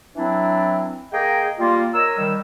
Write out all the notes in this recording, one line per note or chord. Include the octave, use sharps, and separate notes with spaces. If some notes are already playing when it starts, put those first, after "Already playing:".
E3 F#3 C4 D4 E4
A#3 G#4 D#5 G5
G3 A#3 F4
A#4 C#5 D#5 E6
D#3 G3